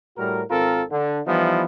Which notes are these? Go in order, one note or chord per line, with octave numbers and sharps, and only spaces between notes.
A2 G3 F#4 A#4
G#1 C4 F4 A4 A#4
D3
E3 F3 G3 B3 D#4 E4